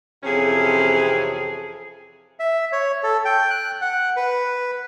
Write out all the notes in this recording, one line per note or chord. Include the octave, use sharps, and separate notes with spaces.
F2 C3 E3 C#4 G#4
E5
C#5
A4
G5
F#6
F#5
B4